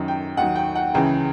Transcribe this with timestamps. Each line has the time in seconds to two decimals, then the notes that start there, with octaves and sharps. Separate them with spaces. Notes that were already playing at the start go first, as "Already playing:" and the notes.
Already playing: F#2 D#3 F#3
0.08 G5
0.37 D#2 D#3 F#3 F#5
0.56 G5
0.75 F#5
0.94 C#2 C#3 E3 G5